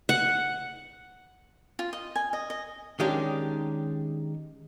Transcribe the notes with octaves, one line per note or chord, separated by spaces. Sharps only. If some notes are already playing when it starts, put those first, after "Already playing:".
F#5
F4
D#5
G#5
D#5
D#5
D#3 G#3 C#4 D4 G4